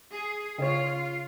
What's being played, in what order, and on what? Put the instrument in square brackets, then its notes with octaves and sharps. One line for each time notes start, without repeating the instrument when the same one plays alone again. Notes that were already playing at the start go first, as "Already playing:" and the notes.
[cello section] G#4
[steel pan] C#3 C#5 [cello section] F4 F5